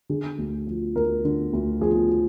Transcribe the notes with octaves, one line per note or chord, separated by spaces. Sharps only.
D3 G#4
D2
F3
D2 A#4
D3
D2
F3 G#4